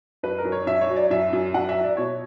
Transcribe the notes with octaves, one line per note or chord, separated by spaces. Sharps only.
F#2 B4
A#4
F#2
C#5
F#2 E5
C#5
F#3
D5
F#2 E5
F#2
F#2 F#5
E5
F#3
D5
B2 C#5